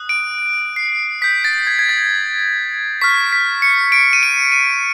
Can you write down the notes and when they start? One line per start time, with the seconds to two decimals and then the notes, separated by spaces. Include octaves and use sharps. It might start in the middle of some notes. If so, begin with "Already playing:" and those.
Already playing: D#6 F#6
0.09 D7
0.76 C7
1.21 D#6 G6 B6
1.44 A6
1.67 G#6
1.79 G#6
1.89 A6
3.01 C#6 F6 B6
3.32 B6
3.62 C#7
3.92 D7
4.13 D#7
4.23 D7
4.52 D#7